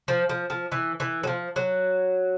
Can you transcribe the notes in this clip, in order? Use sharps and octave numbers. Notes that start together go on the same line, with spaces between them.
F3
F3
F3
E3
E3
F#3
F3
F#3